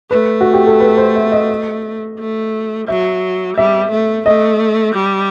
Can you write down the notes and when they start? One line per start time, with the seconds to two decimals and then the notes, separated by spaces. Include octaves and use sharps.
0.11 A3 B4
0.41 F#4
0.54 G4
0.67 A4
0.80 B4
0.97 C5
1.16 E5
1.32 D#5
2.19 A3
2.88 F#3 E5
3.57 G3 E5
3.91 A3
4.26 A3 D#5
4.95 G3